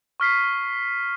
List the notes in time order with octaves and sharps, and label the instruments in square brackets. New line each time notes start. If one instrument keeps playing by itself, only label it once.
[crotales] C#6 F6 B6 C7